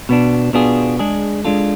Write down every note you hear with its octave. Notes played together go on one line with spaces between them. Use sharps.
B2 B3 D4
B2 B3 D4 F4 G#4
G#3 D4 G#4
G#3 D4 F4 A4